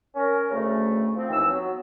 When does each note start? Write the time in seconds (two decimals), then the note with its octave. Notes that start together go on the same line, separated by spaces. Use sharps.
0.15 C#4 A#4
0.52 D2 C#3 A3
1.16 F3 C4
1.30 D#2 E3 F3 C4 E6
1.50 F#3 B3